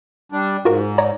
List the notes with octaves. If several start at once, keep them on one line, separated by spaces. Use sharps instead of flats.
G3 D4
G#2 F4 F#4 A#4
C#5 D5 A#5